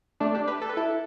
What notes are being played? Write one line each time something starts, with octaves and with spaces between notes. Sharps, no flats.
A3 D4
D4 G4
G4 B4
A4
B4
E4 A4